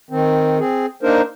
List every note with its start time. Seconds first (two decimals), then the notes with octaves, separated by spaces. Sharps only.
0.11 D#3 C4
0.59 C4 G#4
1.03 A#3 D4 D#4 A#4 C5